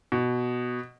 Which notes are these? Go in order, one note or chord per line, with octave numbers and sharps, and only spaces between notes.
B2